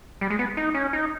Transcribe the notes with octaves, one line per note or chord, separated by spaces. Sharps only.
G3
G#3
B3
D#4
C#4
D#4